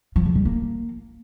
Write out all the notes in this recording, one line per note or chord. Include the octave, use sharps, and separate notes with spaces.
F3
C#3
G3
A#3